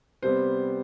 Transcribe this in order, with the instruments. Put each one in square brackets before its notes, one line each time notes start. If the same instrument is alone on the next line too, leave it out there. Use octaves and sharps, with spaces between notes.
[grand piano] C3 G3 B3 C5